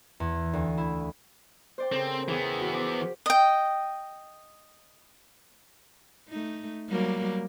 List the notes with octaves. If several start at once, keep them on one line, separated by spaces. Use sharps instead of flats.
E2
D2
E4
C5 D5 G5
C#3 C4 A4 A#4
E3 B3 G#4 G5
F#4
C5 D6
D#5 G5
A3 D#4
F#3 G3 A#3